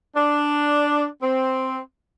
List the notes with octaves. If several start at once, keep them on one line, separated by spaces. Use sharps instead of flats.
D4
C4